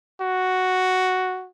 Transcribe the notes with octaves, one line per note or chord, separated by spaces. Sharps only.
F#4